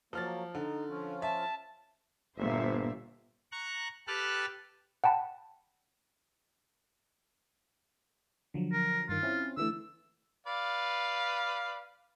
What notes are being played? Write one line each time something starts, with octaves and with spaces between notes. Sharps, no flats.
F3 F#3 A#3 F6 A6
D3 D#4
F3 C#4 F4
E5 A5
G1 A#2 C5 E5
A#5 C#6 F#6
G4 A4 B4 A5 F6 F#6
F#5 G5 A5 B5
D3 F3 F#3
A#4
G2 D#3 F4
C4 C#4 E4
D3 E3 A3 E6
B4 D5 F5